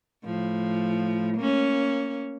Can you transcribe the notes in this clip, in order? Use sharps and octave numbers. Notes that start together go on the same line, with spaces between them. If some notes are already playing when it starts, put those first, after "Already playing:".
A2 F3
A#3 C#4